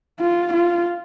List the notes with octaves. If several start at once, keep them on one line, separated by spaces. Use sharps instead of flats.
F4
F4